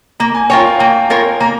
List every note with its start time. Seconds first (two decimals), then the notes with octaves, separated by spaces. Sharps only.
0.20 A#3 A#5
0.35 G#5
0.50 F4 A#4 C#5 G5
0.65 F5
0.79 A#3 G5
1.10 F4 A#4 C#5
1.40 A#3 A#5